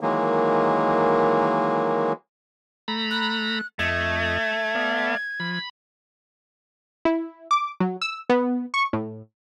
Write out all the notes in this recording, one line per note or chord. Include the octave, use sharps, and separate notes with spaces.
D#3 E3 F#3 G#3 A#3
A3 A#5 B5
F#6
F2 A3 D#5 G#6
B3 D5 F5
F3 B5
E4
D6
F#3
E6
B3
C#6
A2